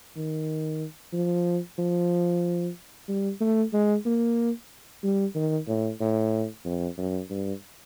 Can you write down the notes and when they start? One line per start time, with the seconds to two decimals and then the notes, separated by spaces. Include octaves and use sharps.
0.16 D#3
1.13 F3
1.78 F3
3.08 G3
3.41 A3
3.73 G#3
4.06 A#3
5.03 G3
5.35 D#3
5.67 A2
6.00 A2
6.65 F2
6.98 F#2
7.30 G2